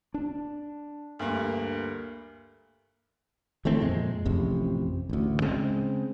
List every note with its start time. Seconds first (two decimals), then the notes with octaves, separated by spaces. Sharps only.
0.14 D4
1.19 D2 G2 A#3
3.65 D#3 E3 A3 C4
3.80 F2 A#2 G#3
4.26 A1 F2 C3
5.09 A1 D2
5.41 C#3 G#3 C4